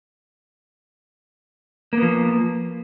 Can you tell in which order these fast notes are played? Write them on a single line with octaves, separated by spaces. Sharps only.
A#3 B3 F3